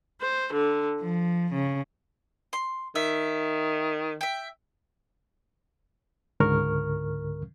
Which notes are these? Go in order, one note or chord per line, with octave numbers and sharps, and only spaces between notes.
C5
D3
F3
C#3
C6
D#3 E5
E5 G5
C#2 G#2 D3 A#4 C#6 F6